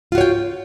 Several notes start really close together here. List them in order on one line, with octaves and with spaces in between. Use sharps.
F4 F#4 C#5 G5